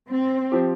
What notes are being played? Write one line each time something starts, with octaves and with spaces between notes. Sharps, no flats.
C4
F3 C4 G4